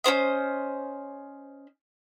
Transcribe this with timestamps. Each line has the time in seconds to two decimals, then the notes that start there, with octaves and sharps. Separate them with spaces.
0.04 C#4 E4 C5 D#5